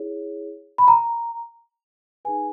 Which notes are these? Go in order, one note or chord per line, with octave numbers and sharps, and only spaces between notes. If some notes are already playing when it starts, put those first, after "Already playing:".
Already playing: E4 G#4 C#5
B5
A#5
D#4 G#4 B4 G#5